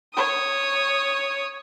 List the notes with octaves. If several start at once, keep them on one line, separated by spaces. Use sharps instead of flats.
C#5 D#6